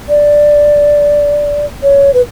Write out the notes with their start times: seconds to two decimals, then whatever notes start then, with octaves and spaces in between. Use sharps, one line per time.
0.09 D5
1.83 C#5
2.14 B4